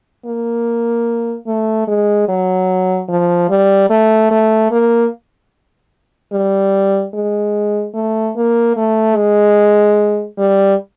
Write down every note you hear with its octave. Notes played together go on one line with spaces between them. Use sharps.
A#3
A3
G#3
F#3
F3
G3
A3
A3
A#3
G3
G#3
A3
A#3
A3
G#3
G3